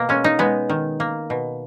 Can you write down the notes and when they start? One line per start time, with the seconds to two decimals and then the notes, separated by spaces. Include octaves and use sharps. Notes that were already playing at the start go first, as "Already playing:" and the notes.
Already playing: B2 A#3
0.09 G#3 C#4
0.24 D#4
0.39 G#3 B3
0.70 D#3
1.00 A#3
1.30 B2